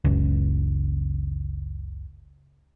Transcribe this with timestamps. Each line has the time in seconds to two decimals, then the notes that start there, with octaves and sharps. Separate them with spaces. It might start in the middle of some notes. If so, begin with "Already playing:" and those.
0.05 F#1 C#2